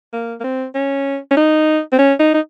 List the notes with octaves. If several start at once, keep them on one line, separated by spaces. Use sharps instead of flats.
A#3
A#3
C4
C#4
C#4
D#4
C4
C#4
D#4
D#4